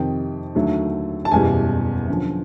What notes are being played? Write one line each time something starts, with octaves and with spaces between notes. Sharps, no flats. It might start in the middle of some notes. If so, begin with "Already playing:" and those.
Already playing: F2 C3 D#3 G5
D#2 D3 F#3 A3
A5
F#1 E2 B2 G3 G#5
F#2 D3 F3